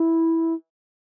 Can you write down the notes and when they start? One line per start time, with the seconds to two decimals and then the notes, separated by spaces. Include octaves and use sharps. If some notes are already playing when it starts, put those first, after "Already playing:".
Already playing: E4